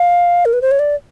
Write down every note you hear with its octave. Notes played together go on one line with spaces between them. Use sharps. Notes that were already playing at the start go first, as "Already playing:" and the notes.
Already playing: F5
A#4
B4
C5
C#5
D5